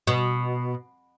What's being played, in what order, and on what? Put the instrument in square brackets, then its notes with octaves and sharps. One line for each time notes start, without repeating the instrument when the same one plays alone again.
[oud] B2